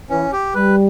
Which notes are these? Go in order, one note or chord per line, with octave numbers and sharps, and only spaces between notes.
E3 C#4
G4
G3 B4